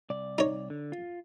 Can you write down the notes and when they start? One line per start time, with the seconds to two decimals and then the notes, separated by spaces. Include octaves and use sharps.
0.10 C2 D5
0.38 D#4 C#5
0.70 D3
0.92 F4